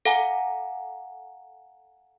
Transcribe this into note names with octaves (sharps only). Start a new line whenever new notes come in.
A4 F5 F#5 G#5 A#5